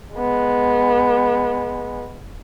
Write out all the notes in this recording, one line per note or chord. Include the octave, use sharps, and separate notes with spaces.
G#3 B3